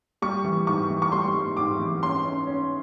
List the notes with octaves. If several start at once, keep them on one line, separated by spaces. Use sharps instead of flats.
G3 C#6
E3
G#2 C#6
E3
C#6
G3 C6
G3
G#2 D6
E3
C#4 C6
C#4
C#4